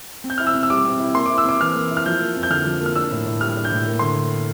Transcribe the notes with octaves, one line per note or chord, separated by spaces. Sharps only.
C4
G6
E4 F6
E6
C3
E6
G3 D6
C4
E4
A#3 C6
E4 D6
E6
C3 D6
E3 F6
A#3
E4
F6
F3 G6
A#3
F2
G6
D3 F6
F3
A#3 F6
D4 E6
A2
A2
G3 F6
D4
G6
A2
A#3
D3 C6